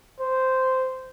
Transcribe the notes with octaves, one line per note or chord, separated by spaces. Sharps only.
C5